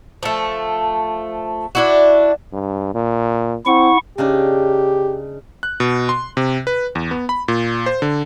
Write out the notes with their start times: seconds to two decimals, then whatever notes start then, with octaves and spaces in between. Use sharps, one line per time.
0.23 F3 A3
1.75 D4 E4 F#4
2.53 G2
2.94 A#2
3.66 C4 E4 F#5 C#6
4.18 C#3 D4 D#4 G4
5.63 F#6
5.80 B2
6.09 C6
6.37 C3
6.67 B4
6.95 E2
7.11 B3
7.29 B5
7.48 A#2
7.86 C5
8.02 D3